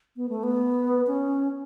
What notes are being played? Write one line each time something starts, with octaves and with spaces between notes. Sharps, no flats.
B3
A3
B3
C#4